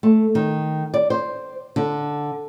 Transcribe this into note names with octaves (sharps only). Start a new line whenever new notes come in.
A3
D#3
D5
C5
D3